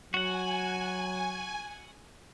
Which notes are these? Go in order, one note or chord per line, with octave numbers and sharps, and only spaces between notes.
F#3 F#4 F#5 G#5